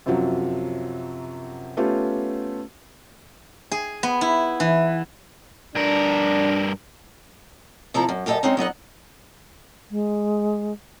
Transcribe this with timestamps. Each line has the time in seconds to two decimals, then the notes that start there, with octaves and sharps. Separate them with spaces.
0.06 F#2 C3 F3 F#3
1.77 A3 B3 C#4 F4 G4
3.72 G#4
4.03 B3
4.21 E4
4.60 E3
5.75 G2 D4 A#4
7.94 C3 F3 E4 A4 C5 A#5
8.09 F#2
8.26 F#2 G4 A4 A#4 D#5 E5
8.43 G#3 C4 C#4 D#4
8.57 F#3 B3 D#4 F#5
9.89 G#3